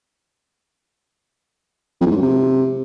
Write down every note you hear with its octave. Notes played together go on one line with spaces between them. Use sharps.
F2
E2
G#2
F#2
C3